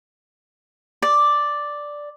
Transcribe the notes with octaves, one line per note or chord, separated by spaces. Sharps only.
D5